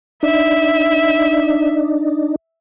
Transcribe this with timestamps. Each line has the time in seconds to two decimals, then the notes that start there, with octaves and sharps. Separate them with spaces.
0.23 D4 D#4 E5